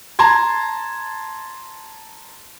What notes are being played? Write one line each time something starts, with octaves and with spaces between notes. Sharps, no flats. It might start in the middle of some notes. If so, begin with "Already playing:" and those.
A5 A#5 C6 G#6